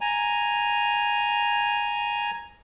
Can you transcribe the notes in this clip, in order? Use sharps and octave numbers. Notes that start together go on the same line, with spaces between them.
G#5 A#5